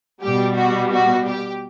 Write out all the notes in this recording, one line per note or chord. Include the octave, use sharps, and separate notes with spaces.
B2 G3 G4
F#4
F#4
G4